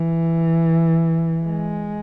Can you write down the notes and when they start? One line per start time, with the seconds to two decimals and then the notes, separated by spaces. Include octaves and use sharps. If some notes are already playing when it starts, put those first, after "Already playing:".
Already playing: E3
1.46 G#3